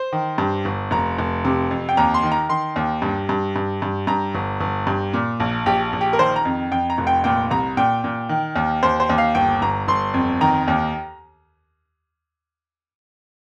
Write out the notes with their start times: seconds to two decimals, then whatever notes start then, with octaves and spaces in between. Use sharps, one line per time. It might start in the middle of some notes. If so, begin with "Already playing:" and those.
Already playing: C5
0.13 D#3
0.38 G2
0.65 G1
0.91 F1 A#5
1.18 F1
1.45 C3
1.71 F2
1.89 G5
1.97 D#2 A#5
2.14 C6
2.23 D#3
2.32 A#5
2.49 D#3 C6
2.76 D#2
3.02 G2
3.29 G2
3.56 G2
3.82 G2
4.07 G2 A#5
4.35 G1
4.61 G1
4.87 G2
5.13 A#2
5.40 A#1
5.66 A#1 G4
5.93 A#1
6.01 G4
6.13 A#4
6.19 D#3 C5
6.36 A#5
6.45 F2
6.71 F2 G5
6.90 A#5
6.98 F1
7.07 G5
7.24 A#2 G5
7.51 C2 A#5
7.77 A#2 G5
8.04 A#2
8.29 D#3
8.56 D#2
8.83 D#2 C5
9.00 C5
9.09 D#2
9.18 F5
9.35 G1 G5
9.62 G1 A#5
9.88 G1 C6
10.14 F2
10.41 D#3 A#5
10.68 D#2